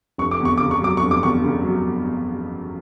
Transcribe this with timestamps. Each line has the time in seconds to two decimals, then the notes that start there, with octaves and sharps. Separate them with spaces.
0.18 F1 C#6
0.31 D6
0.40 E2
0.45 C#6
0.58 C#3 D6
0.71 C#6
0.82 F#3 D6
0.97 C#6
1.02 F1
1.11 D6
1.23 E2 C#6
1.44 C#3
1.64 F#3